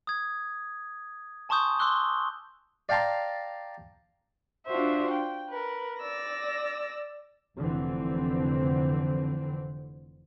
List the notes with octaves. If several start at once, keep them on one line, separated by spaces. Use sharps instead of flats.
D#6 G#6
G#5 A5 C6 C#6 D#6 G6
C6 D6 E6 F#6 G7
D5 F5 G5 A5 A#5 C6
D4 F4 F#4 C5 E5
G5
A#4 B4
D5 E6 A#6
F1 D3 E3 C4